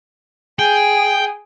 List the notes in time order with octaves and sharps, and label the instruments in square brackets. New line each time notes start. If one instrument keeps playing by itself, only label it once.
[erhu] G#4 [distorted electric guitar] G5